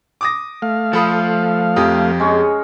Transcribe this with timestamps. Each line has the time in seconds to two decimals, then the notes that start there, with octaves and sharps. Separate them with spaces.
0.21 D6 D#6 A#6
0.62 A3 F5
0.93 F3 A4 B5 D#6
1.76 F2 G4 A#4 D#6
2.20 G#3 C#4 C#5